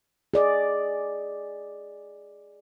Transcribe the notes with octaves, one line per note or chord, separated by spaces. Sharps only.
G#4 D5 D#5